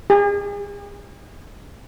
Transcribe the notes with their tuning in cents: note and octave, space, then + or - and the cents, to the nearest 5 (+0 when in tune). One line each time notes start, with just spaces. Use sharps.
G#4 -40